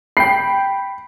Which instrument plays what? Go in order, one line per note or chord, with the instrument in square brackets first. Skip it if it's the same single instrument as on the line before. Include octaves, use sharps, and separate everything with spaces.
[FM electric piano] G5 B5 [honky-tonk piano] C7